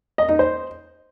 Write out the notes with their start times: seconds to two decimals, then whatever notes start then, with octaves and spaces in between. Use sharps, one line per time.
0.18 D#5
0.29 D#4
0.39 C5